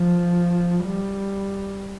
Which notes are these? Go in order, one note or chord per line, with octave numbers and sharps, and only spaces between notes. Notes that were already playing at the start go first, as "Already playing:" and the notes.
Already playing: F3
G3